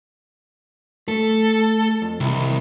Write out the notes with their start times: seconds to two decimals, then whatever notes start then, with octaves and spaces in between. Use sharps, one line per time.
1.08 A3 A4
2.02 F2
2.20 C2 D#3 E3